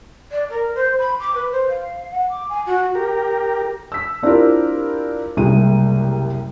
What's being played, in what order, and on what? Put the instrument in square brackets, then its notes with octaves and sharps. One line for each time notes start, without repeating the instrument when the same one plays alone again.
[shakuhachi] D5
A#4
C5
B5
D6
B4
C5
F5
F#5
D6
G#5
F#4
[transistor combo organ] G4 A#4
[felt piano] E6 B6
C4 D4 E4 F4 G4 A#4
F#1 C2 C3 G#3 D#7